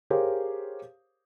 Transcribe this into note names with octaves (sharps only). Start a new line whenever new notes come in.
G4 G#4 A#4 C5 C#5 F5